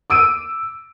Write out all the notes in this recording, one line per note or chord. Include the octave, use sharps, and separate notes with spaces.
D6 E6 D7 D#7